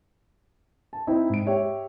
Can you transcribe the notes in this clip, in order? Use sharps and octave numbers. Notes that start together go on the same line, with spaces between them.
A5
C4 D#4 E4
G#2 D7
G4 C#5 E5